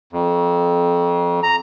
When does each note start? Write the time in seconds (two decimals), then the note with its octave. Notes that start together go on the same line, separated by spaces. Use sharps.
0.13 F2
1.43 A#5